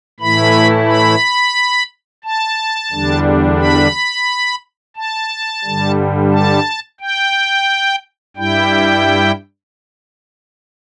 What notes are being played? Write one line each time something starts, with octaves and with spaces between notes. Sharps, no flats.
A2 E3 A3 E4 B5
B5
A5
E2 D3 G3 D4
B5
A5
G2 D3 G3
A5
G5
G2 G3 E4 G5